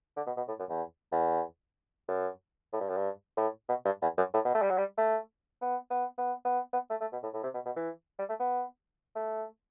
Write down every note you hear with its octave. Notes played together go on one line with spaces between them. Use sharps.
D3
B2
B2
A2
F#2
E2
E2
F#2
A2
G2
F#2
G2
A2
B2
G2
E2
F#2
A2
B2
A3
G3
F#3
G3
A3
B3
B3
B3
B3
B3
A3
A3
B2
A2
A2
C3
B2
B2
E3
G3
A3
B3
A3